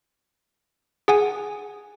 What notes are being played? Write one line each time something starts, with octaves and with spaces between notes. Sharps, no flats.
G#4 F#5 G#5